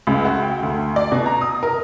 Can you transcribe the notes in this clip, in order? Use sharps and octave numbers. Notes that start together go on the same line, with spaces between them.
C#2
F#4
G5
D2
D5
B2
A#5
D#6
A#4